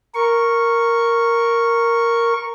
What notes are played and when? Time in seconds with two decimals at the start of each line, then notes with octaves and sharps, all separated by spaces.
0.15 A#4 C#6